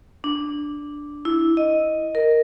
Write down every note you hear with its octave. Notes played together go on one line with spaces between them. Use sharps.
D4
E4
D#5
A#4